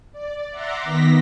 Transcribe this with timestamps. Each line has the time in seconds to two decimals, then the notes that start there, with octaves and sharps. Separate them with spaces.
0.12 D5
0.50 E5 F#5 A#5 C6 D6
0.84 D#3 B3 A#6 B6